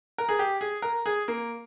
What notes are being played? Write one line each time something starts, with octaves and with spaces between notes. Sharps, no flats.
A#4
G#4
G4
G#4
A#4
G#4
A#3